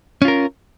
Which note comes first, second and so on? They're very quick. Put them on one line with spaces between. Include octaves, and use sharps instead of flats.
C#4 F4 A#4